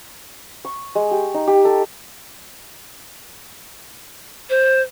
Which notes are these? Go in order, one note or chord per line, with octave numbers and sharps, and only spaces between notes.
C#6
G#3
G4
D#4
G4
A4
C5